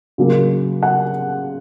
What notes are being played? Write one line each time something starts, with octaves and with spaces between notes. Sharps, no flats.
C#3 F#3 A#3
F#5